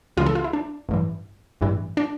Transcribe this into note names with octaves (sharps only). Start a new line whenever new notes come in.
C#2 C#3 E3 F4
A4
F4
E4
D4
A1 G2 E3
A1 G2 E3
D4